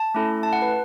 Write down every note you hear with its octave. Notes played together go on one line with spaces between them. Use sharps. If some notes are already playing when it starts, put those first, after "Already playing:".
Already playing: A5
A3 C#4 E4 A4
A5
F#5
B4